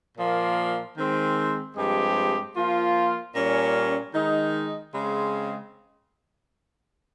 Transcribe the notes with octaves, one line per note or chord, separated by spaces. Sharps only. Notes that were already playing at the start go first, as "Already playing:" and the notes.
A#2 F3 A#3
D#3 G#3 C4
G2 F3 G#3 C4 G4
F3 A#3 F4
A#2 G3 C#4
D#3 G#3 D#4
C#3 G#3 C4